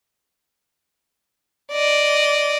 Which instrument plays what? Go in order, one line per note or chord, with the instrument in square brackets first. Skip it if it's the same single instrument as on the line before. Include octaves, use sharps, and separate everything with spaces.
[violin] D5 D#5